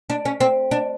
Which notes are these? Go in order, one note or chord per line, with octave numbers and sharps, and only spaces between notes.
D4
C#4
C4
D4